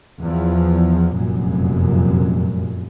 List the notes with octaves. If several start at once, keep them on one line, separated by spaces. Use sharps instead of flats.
E2 F3
F1 F#2 A#2